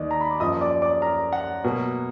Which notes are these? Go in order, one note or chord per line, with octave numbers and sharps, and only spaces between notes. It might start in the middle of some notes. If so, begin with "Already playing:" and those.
Already playing: D#2 D#3 D5 D#5
A#5
B5
D6
F#2 F3 A#3 D#5 D#6
D5 D6
D5 D6
A#4 A#5
F#5
B2 F#3 A#3